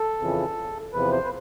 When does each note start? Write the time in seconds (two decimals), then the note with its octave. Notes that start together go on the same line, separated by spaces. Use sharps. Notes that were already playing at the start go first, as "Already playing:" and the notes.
Already playing: A4
0.19 F2 C#3 E3
0.93 E2 C3 F3 B4
1.12 C5
1.25 B4